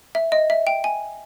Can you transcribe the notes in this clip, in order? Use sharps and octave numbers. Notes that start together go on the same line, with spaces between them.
E5
D#5
E5
G5
G#5